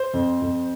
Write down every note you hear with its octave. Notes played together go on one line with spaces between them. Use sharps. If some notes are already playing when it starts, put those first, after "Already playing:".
Already playing: C5
F2
F2